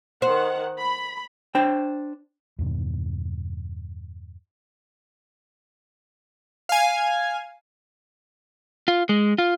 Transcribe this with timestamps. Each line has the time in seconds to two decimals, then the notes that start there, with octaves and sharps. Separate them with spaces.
0.22 D#3 C5 F#5
0.79 B5
1.55 D4 C5 G5
2.59 E2 G2 B2 D#3
6.69 F5 G#5
8.88 F4
9.09 G#3
9.38 F4